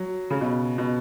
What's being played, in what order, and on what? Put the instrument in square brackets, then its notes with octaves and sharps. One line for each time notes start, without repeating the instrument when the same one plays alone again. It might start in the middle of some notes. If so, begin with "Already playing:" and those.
Already playing: [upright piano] F#3
C#3
B2
B2